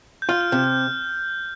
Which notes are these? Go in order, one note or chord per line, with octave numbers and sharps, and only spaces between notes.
G6
F4 F6
F6
C3 G6
G6